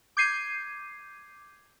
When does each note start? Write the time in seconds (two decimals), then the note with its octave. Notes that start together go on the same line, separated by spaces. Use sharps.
0.17 D6 G6 G#6 C7 D#7